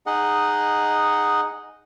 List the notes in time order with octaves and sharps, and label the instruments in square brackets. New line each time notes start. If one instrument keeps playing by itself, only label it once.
[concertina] D#4 G#4 D#5 F#5